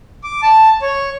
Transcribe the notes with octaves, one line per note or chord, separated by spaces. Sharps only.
D6
A5
C#5